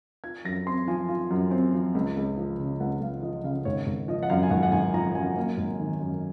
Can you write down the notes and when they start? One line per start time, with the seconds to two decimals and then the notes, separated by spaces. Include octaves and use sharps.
0.24 F4 G#6
0.45 F#2 A#6
0.66 C4 C6
0.88 F3 G#5
1.08 F4
1.30 F#2
1.51 C4
1.73 F3
1.95 C#2
2.16 C#2
2.37 F3
2.59 C#3
2.80 C#2 F#5
3.01 C#2 F5
3.22 F3 D#5
3.44 C#3 F5
3.65 G#1 C#5
3.87 G#1
4.08 F3 D#5
4.23 F#5
4.30 F#2 F5
4.43 G#5
4.51 G#1 F#5
4.63 F#5
4.72 G#1 G#5
4.94 F3 A#5
5.15 F#2 G#5
5.36 A#3
5.58 G#1
5.80 D#3
6.00 F#2